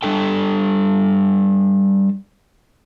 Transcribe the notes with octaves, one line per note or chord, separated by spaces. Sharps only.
G3 D4 A4 G5